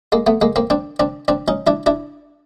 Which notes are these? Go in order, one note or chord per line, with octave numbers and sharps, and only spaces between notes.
G#3 A#3
A3 B3
G#3 A#3
A#3 C4
C4 D4
C4 D4
C4 D4
C#4 D#4
D4 E4
D4 E4